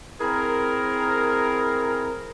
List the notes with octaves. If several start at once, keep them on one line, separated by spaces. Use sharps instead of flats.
C4 E4 G#4 A#4